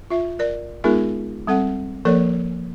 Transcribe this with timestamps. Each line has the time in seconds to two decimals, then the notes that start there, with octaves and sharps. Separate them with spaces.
0.10 F4 E5
0.39 A#4 D5
0.84 G#3 B3 D#4 F4 G#4 A#4
1.47 G3 C4 A4 F#5
2.05 F3 A#3 A4 A#4 C#5 D5